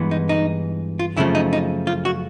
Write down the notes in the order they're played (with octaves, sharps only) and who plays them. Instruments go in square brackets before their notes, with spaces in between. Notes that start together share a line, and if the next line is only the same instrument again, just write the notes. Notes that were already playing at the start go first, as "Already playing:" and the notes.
Already playing: [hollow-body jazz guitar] G2 E3 G#3 B3
D#4
D#4
F4
F#2 C#3 F3 A3 E4
D#4
D#4
F4
F#4